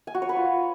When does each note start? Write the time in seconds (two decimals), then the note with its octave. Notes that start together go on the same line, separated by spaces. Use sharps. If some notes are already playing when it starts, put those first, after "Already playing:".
0.07 G#5
0.15 F#4
0.22 C#5
0.29 B4
0.36 F4